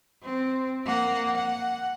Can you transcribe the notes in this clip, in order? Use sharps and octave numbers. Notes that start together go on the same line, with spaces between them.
C4
A#3 F#5
F#5